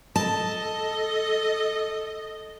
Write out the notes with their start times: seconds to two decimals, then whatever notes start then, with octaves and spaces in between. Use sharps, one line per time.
0.16 A4 D#5 A5